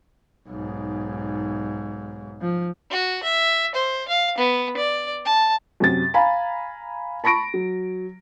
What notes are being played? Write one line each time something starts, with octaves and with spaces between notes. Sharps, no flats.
B1 G#2
F3
F#4
E5
C5
F5
B3
D5
A5
F#2 C3 A6
F5 G#5 A#5 B5
A5 B5 C#6 A#6 D7
F#3